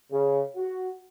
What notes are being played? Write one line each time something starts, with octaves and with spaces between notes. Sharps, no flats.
C#3
F#4